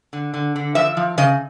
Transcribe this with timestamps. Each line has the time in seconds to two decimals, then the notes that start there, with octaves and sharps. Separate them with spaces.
0.13 D3
0.34 D3
0.56 D3
0.75 F3 E5
0.97 F3
1.18 C#3 D#5